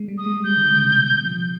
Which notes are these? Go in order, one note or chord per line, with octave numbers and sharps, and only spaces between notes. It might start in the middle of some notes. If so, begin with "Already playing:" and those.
Already playing: G#3
G3
D#6
G#3
G3 G6
D3
C#3
C3
B2
F3